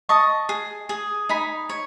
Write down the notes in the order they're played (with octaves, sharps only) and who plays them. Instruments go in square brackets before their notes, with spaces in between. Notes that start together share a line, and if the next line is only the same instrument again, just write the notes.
[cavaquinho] D#5 A5 C#6
G#4
G#4
D#4 G#5 B5
C#5